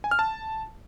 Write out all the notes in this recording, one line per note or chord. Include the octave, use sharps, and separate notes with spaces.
G#5
F6
A5